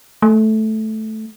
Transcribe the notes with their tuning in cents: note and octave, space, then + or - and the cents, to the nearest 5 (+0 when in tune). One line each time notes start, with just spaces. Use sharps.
A3 -10